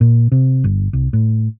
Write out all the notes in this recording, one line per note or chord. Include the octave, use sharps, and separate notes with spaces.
A#2
C3
G1
C2
A2